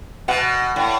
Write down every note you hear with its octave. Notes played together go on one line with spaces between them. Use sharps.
B2 F#5
A2